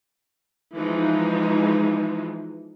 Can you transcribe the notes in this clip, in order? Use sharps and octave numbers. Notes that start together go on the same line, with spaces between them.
E3 F3 G#3 D#4